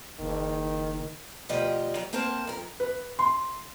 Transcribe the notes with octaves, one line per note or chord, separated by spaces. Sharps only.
F#1 D#3
D2 B2 F3 G4 D5 D#5
F#3
A#3 C4 A#4 C5 A5
F2 A#4
B4
C6